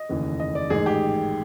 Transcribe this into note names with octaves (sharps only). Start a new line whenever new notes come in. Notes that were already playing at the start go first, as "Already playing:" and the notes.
Already playing: D#5
F1 D#2 C#3 E3
D#5
D5
A1 G#2 D#3 G#4
G4